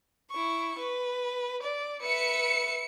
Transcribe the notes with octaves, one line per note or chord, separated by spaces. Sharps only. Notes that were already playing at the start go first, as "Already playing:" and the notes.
E4 C#6
B4
D5
B4 E5 C#7